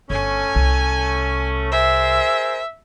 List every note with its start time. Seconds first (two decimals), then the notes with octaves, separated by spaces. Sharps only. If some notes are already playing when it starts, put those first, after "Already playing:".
0.10 G1 A3 C#4 G#5
0.56 C2
1.72 G#4 A#4 C5 E5